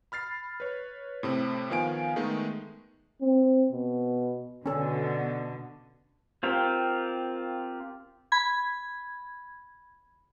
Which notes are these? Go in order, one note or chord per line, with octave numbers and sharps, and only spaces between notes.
B5 F6 A6 C7
B4 C#5
A2 C3 C4
D#3 F3 B3 F5 G#5 D7
D#3 G#3 A3 B3 D#4
C4
B2
B2 D3 C#4 A4
C4 F4 G4 A#4
B5 G#6